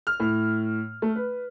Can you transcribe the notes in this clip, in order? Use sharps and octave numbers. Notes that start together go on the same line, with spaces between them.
F6
A2
A3
B4